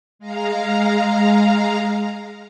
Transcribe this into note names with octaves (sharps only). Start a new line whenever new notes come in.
G#3 F5 A#5